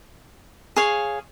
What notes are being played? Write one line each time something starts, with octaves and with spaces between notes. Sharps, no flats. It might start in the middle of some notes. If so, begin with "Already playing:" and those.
G#4 C#5 F5